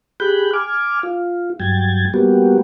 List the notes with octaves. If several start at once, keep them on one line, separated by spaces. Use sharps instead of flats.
G4 G#4 B5 F#6 G6
G#5 D6 F6
F4
G2 F#3 G5 G#6 A6
G3 A#3 B3 F#4 G4